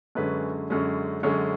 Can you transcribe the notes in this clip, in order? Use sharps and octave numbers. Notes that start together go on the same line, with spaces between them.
F#2 D3 G#3 C#4 B4
F#2 D3 G#3 C#4
F#2 D3 G#3 C#4 C#5